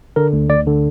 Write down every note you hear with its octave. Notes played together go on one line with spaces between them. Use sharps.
D3 A#4
D2
D2 D5
D3